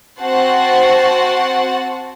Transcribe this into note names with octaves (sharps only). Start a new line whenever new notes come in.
C4 F#4 C5 F#5 A5